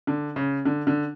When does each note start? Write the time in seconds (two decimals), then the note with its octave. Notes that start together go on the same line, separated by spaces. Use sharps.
0.07 D3
0.36 C#3
0.65 D3
0.87 D3